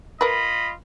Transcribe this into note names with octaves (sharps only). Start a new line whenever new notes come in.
F4 A#4 B4 D#5 B5